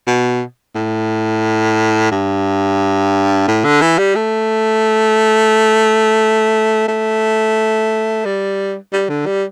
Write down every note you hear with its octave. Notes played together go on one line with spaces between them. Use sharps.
B2
A2
G2
A2
D3
E3
G3
A3
A3
G3
G3
D3
G3